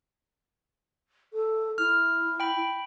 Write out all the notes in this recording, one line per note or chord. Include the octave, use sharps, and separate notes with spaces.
A4
E4 F6
G5 B5